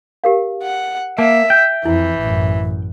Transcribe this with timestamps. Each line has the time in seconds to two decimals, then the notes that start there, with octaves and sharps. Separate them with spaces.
0.24 G4 A#4 F5
0.63 F#5
1.18 A#3 E5 A5
1.50 G5
1.85 F2 E3 E4
2.20 A1 F#2